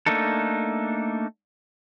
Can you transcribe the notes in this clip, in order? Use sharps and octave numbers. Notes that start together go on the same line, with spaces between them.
A3 A#3 D4 D#4 A4